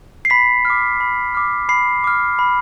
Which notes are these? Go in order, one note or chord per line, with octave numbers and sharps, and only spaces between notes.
C7
B5 B6
D6 F6
B5
D6 F6
B5 C7
D6 F6
B5